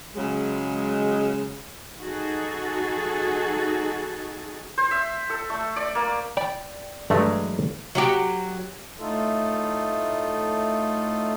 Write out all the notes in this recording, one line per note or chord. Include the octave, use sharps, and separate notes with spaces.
C#3 F#3 G#3
D#4 F#4 G#4 A4
C5
E5
A4
A3
D5
A#3
D5 G5 B5
G2 E3 F#3 G#3 A3
F#3 F#4 G4
A2 A3 D#4 F4 A4